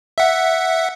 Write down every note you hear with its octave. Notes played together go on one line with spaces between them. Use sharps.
E5 F#5